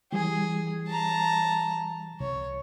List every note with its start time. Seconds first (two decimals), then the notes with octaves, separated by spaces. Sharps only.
0.12 E3 G3 G#4
0.88 A5 A#5
2.20 C2 C#5